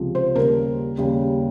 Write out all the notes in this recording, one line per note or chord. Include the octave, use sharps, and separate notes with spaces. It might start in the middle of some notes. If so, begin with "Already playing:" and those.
Already playing: C#2 C3 F3
C5
D#2 C#3 G3 A#4
D#2 C#3 G3